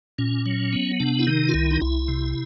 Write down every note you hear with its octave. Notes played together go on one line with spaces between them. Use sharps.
A#2 C#4
F#3
B3
C3 D4
E4
D#3 D#4
F4
C2 E4
D#4
C2 E4
C3